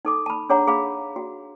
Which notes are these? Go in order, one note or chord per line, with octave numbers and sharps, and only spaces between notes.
D#4 A4 D6
A5 B5
D4 G#4 C#5 F#5 A#5
G#4 F5 B5
F#4